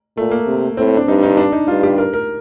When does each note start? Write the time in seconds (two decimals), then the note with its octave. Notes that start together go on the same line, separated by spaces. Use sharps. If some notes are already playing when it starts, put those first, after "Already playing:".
0.17 A#2 A3
0.31 A#3
0.47 C3
0.77 A2 C4
0.97 D4
1.08 G2 D#4
1.23 D#4
1.37 D4
1.52 D#4
1.68 G2 F4
1.83 G4
1.98 A#4
2.14 A#4